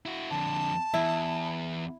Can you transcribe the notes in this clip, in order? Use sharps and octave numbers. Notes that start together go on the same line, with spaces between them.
E4 F#4
F2 D3 A5
E2 E4